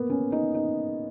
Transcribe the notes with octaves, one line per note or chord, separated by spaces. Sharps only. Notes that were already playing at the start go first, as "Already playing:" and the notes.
Already playing: A#3 B3
C#4
D#4
D#4